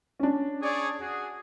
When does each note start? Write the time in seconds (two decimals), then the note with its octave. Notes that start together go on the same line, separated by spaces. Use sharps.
0.20 C#4 D4
0.61 G#4 C#5 D5
0.99 F#4 G#4